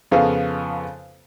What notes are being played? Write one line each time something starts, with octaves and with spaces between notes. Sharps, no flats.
F2 C#3 B3 F4 A4 F5